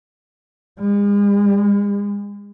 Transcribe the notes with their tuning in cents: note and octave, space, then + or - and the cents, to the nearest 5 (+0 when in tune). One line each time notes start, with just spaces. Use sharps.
G#3 -40